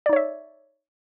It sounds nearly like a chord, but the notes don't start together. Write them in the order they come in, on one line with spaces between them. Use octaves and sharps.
D5 D#4 C#5 E5